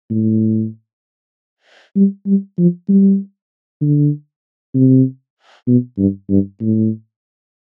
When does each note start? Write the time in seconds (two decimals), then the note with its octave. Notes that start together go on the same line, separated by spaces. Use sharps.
0.10 A2
1.96 G3
2.27 G3
2.58 F3
2.89 G3
3.81 D3
4.74 C3
5.67 B2
5.98 G2
6.29 G2
6.61 A2